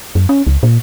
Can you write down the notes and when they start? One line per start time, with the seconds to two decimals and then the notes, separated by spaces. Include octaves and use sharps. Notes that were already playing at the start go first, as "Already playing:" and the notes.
0.15 F#2
0.29 C#4
0.47 C#2
0.63 A#2